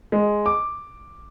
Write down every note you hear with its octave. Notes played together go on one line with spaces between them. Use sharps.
G#3
D6